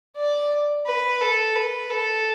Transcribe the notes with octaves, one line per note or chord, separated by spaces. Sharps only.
D5
B4
A4
B4
A4